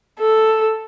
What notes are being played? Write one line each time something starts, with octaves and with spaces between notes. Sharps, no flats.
A4